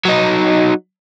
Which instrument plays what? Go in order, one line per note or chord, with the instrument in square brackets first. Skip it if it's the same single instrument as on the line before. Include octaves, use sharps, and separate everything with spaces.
[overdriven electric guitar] F#3 D#4